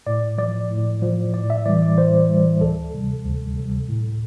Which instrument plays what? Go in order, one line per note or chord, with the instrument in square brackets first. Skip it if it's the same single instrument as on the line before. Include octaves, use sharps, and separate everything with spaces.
[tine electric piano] A2 D5
F3 D5
A2
F3
A2 D5
E5
E3 G3 D5
D5
A2 C5
E3 G3
D2 A4
C3 G3
D2
C3 G3
A2